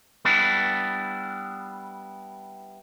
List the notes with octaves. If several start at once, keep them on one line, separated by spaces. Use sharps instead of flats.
G3 B3 D4 E4